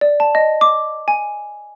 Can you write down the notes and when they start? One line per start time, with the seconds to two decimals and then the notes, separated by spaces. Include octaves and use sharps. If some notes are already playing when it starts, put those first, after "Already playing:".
0.01 D5
0.20 A5
0.35 D#5
0.61 D6
1.08 G#5